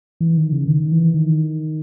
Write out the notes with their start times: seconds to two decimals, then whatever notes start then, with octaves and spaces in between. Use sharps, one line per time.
0.21 E3
0.37 D#3
0.52 C#3
0.68 D#3
0.92 E3
1.15 D#3